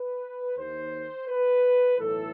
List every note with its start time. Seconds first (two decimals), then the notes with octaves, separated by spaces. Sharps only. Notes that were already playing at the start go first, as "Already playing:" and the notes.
Already playing: B4
0.57 D#2 D#3 C5
1.28 B4
1.99 B1 A2 E3 A4